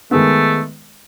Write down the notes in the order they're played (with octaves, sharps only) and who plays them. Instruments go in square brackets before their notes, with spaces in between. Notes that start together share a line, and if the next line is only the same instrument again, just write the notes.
[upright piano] D#3 G#3 B3 [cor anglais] A3